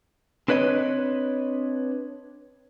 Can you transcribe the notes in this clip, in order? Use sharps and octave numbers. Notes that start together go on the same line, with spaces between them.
C4 D4 B4 C#5 D#5